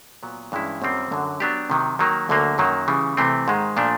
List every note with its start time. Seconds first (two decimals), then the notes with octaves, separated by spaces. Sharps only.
0.23 A#2 F#3 B3
0.52 G2 E3 G#3 C#4 E4
0.82 F#2 D#3 G3 C4 F4
1.12 F#2 D3 F#3
1.40 F#3 B3 D4 G4
1.70 C3 D#3 F#3
1.99 D#3 F#3 A#3
2.29 D2 D3 F#3 A#3
2.58 F#2 D#3 F#3 A#3
2.88 C#3 E3 G3
3.17 C3 E3 A3 C4
3.48 G#2 D#3 G#3
3.77 A#2 F3 A3 D4